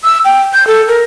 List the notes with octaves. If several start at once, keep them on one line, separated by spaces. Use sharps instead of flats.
E6
G5
G6
A4
A#4